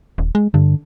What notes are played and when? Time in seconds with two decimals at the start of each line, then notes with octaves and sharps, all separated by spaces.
0.18 D#1
0.35 G#3
0.54 G2 D3